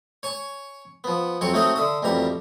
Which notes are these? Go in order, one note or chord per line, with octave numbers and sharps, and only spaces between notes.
C#5 G#5 C#6
F3 B3
F2 F#3 C4 C#5 C#6
A3 C4 D#4 F#4 C#5 D#5
D3 E5 D#6
A1 F2 B2 G3 G4 A#5